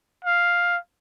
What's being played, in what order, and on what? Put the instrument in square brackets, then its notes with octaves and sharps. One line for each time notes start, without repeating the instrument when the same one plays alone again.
[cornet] F5